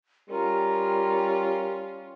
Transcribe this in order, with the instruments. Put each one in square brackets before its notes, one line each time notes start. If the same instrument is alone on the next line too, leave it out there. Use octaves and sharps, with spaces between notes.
[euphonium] G3 [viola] C#4 F4 [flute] A#4